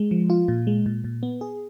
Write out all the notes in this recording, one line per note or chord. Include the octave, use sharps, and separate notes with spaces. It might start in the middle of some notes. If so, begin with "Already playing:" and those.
Already playing: G#3
F3
F4
A#2
G#3
A#2
A#2
B3
G#4